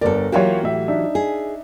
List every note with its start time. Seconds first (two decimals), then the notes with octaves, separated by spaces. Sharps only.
0.01 G1 D3 A4 A#4 D5
0.32 E3 F#3 A#3 F4 G4 C#5
0.63 A2 E5
0.88 D4 D#4 E5
1.15 G#4